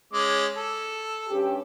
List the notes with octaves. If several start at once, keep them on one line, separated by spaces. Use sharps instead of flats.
G#3 C#4 D6
A4
G2 C#4 G4